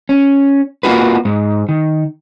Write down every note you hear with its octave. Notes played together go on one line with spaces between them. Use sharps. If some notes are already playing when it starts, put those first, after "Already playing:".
C#4
A#3 C4 F4 F#4 B4
G#2
D#3